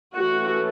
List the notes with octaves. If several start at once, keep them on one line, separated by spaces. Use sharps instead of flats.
E3 A3 C#4 F#4